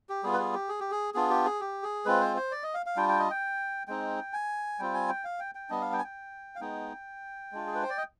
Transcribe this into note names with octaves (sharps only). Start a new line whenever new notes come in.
G4
G3 B3 F4 G#4
B4
G#4
G4
G#4
G4
G#4
B3 D4 F4 G#4
G4
G#4
G4
G#4
G#3 C4 F4 B4
C5
C5
D5
D#5
F5
F5
G3 D4 F4 G5
G5
D#5
G5
G#3 C4 D#4 G5
G#5
G3 C4 F4 G5
G#5
G5
F5
G5
G5
G3 B3 D4 D#5
F5
G5
G#5
G5
F5
G#3 B3 D#4 G5
G#3 D4 F4
G#4
B4
C5
D5
D#5